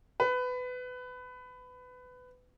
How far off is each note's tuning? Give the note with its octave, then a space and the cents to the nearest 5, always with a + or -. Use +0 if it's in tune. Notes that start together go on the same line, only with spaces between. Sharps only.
B4 +20